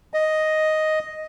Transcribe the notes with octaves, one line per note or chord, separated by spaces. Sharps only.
D#5